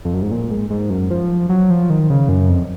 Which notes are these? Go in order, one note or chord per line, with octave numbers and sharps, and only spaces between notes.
F2
F#2
G#2
A#2
G#2
G#2
F#2
F3
F#3
F3
D#3
C#3
F#2
F2